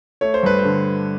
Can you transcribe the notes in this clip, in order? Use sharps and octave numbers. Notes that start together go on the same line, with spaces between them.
A3 C#5
C5
G2 B4
C5
D3